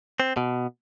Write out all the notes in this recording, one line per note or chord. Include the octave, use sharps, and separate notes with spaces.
C4
B2